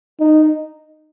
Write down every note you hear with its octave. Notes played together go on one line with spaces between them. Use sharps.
D#4